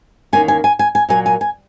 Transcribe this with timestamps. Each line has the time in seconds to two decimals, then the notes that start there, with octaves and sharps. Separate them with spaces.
0.33 E2 D#3 A#3 C#4 G#5
0.48 G#5
0.64 G#5
0.79 G#5
0.95 G#5
1.09 A#2 F#3 A#3 G#5
1.26 G#5
1.41 G#5